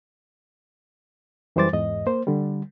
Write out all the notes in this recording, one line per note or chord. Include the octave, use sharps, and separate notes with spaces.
F#2 E3 G3 C5 D6 A6
E2 G#2 D#5
A#3 C5
D3 G3